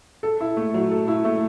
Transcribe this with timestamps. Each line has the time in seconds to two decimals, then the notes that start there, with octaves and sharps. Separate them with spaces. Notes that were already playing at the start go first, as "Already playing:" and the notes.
0.23 A4
0.41 E4
0.57 A3
0.74 F#3
0.91 A4
1.08 E4
1.25 A3